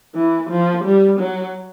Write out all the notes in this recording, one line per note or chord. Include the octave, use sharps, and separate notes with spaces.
E3
F3
G3
F#3